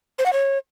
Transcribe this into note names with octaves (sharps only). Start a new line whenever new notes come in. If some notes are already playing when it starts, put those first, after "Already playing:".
C5
F#5
C#5